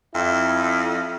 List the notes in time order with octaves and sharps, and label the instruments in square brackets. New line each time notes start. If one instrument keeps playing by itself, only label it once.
[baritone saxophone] F2 [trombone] E4